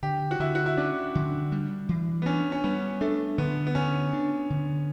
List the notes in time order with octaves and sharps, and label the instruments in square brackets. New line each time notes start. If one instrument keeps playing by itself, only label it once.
[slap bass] D3 [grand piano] G4
[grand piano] F#4
[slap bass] D3 [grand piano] E4
[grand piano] F#4
E4
[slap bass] C#4 [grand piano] D4
[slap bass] D3
G3
E3
[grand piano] B3
[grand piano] C#4 [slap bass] D4
[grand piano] C#4
[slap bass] G3 [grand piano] B3
[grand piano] A3 [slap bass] D4
[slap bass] D3 [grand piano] B3
[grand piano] B3
[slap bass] D3 [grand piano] C#4
[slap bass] D4
D3